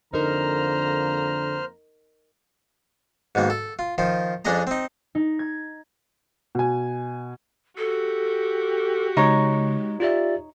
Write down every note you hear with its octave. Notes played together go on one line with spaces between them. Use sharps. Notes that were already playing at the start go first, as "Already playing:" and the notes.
F2 D3 A#3 D#4 A#4 C5 A#5 F6
G#2 B2 D#3 A#3
A4
F4
D#3 F3 F4
F2 C#4 D4 G#4 D#5 A#5
C4 D#4
D#4
G#6
B2 G#5
F#4 G4 A4
C#3 G#3 D#4 C#5
F4 G4 D5 E5